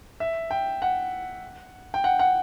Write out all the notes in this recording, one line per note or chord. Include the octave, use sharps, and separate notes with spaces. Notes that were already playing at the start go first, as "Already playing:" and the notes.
E5
G5
F#5
G5
F#5
F#5